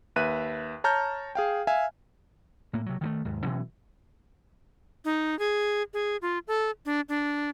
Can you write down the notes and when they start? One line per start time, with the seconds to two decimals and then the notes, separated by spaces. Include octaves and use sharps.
0.16 D#2 B4 E5 F#6 D#7
0.84 C#5 A5 A#5 F6 G6
1.35 G#4 F5 G5
1.67 E5 F5 G#5
2.73 A2 A#3
2.86 C3 F#3
3.01 D#3 F3 A3
3.25 D#2 G#2
3.43 B2 E3 F#3 C#4
5.05 D#4
5.39 G#4
5.94 G#4
6.22 F4
6.48 A4
6.86 D4
7.09 D4